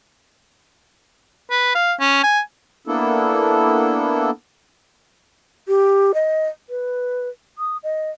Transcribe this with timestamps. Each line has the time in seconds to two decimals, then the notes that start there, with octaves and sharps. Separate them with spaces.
1.51 B4
1.75 F5
2.00 C#4
2.23 G#5
2.87 A#3 B3 D4 E4 A4
5.68 G4
6.14 D#5
6.69 B4
7.58 D#6
7.83 D#5